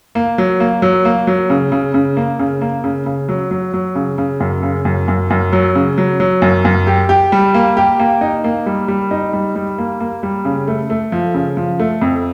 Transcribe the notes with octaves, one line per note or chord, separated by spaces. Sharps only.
A#3
F#3
A#3
F#3
A#3
F#3
C#3
C#3
C#3
A#3
C#3
A#3
C#3
C#3
F#3
F#3
F#3
C#3
C#3
F#2
C#3
F#2
F#2
F#2
F#3
C#3
F#3
F#3
F#2
F#2
G4
G4
G3
A#3
G4
A#3
D#4
A#3
G3
G3
D#4
G3
G3
A#3
A#3
G3
C#3
A3
A3
F3
C#3
F3
A3
F2